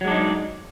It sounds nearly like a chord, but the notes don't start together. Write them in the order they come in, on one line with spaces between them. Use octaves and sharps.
F#3 G#3 D4 D#4